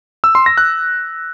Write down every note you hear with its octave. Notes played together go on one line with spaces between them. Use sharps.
E6
C6
A#6
F#6